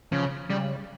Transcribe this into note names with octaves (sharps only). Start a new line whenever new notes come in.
C#3 F3
C#3 G3